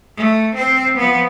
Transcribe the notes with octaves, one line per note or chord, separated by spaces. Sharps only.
A3
C4 C5
F3 B3